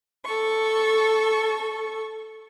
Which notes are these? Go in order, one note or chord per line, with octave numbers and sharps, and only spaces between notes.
A4 C#6